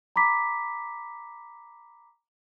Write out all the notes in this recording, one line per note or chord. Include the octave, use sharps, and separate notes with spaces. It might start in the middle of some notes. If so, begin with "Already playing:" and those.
A#5 B5 D6 B6